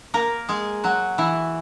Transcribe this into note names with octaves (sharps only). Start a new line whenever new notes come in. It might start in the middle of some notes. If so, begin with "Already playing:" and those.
A#3 A#4
G#3 G#4
F#3 F#4
E3 E4